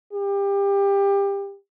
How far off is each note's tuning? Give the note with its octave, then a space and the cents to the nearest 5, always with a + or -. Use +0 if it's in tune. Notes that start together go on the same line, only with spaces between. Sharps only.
G4 +25